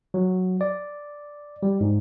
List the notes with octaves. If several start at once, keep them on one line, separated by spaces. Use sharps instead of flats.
F#3
D5
G3
G#2